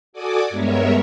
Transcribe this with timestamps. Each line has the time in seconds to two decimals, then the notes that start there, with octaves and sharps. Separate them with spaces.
0.13 F#4 A4 D5 G#5 D6 D#6
0.50 G2 G#3 B3 A#4 C#5 E5